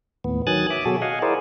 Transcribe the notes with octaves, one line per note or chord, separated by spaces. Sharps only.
D#2 A2 B3
D#3 F#3 G#5 D#6 F#6 A6
E5 D6
B2 F#3 F#4 G#4 A4
D#5 F5 F#5 G#5
E4 G#4 A#4 C5 D5